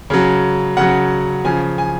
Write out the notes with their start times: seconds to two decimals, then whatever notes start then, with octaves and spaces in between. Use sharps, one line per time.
0.10 C#3 F#3
0.77 C#3 F#3 F#5
1.45 C#3 F3 G#5
1.78 G#5